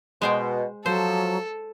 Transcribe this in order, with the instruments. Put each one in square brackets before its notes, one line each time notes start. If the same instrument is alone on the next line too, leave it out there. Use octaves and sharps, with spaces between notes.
[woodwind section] B2 [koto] G#3 C5 G5
[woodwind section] F3 [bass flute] F#3 [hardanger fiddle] A4 [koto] C5